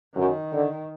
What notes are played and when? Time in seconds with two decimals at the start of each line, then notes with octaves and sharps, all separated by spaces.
0.15 F#2 D#3
0.52 D3